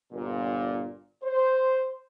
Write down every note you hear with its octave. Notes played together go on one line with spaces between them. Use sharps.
G1 A#2
C5